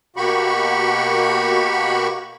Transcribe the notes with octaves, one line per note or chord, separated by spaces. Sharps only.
B2 A#3 F#4 G4 B5 C#6